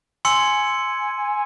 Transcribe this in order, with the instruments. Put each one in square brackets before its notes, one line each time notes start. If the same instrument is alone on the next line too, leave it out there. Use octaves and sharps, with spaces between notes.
[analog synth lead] G#5 [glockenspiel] C6 E6 C#7